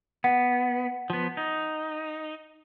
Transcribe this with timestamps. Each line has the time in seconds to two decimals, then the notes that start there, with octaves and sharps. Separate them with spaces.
0.24 B3 F#5
1.10 F3 B3
1.37 D#4